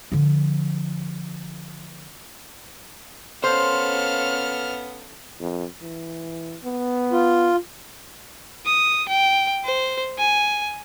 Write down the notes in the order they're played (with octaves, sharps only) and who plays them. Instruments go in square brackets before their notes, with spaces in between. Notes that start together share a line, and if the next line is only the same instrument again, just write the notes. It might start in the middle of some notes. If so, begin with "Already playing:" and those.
[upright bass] D3 F3
[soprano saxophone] B3 [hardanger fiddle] C#4 F5 [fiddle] A4 F6 [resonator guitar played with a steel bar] C5
[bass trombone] F2
E3
B3
[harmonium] F4
[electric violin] D#6
G5
C5
G#5